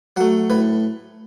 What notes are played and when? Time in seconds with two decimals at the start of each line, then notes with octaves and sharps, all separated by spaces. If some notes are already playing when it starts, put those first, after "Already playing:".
0.17 F#3 A3 F#5
0.50 A2 B4